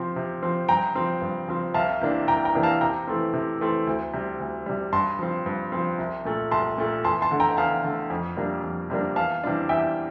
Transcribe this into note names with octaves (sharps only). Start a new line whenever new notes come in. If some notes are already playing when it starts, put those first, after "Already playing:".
Already playing: C3 F3 C4
C3
F3 C4
G2 G5 A#5
F3 C4
G2
F3 C4
C2 F5 A5
C3 E3 A#3 D4
C2 G5 A#5
G5 A#5
C3 E3 A#3 D4
F5 A5
C3 G5 A#5
E3 A3 C4
C3
E3 A3 C4
D2
C3 G3
D2
C3 G3
G2 A5 C6
F3 C4
G2
F3 C4
C2
A#2 A3
C2 A5 C6
A#2 A3
E2 A5 C6
A5 C6
D3 A3
G5 A#5
E2 F5 A5
D3 A3
F2
C3 G3 A#3 D4
F2
C3 G3 A#3 D4
E2 F5 A5
C3 E3 G3 D4
E2 E5 G5